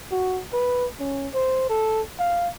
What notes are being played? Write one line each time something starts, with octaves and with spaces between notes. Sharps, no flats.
F#4
B4
C#4
C5
A4
F5